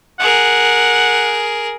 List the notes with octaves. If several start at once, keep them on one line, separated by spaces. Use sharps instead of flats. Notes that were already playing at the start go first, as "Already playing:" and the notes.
G#4 A#4 F#5